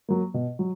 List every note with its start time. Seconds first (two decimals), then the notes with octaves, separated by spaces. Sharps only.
0.09 F#3 A#3
0.34 B2
0.59 F#3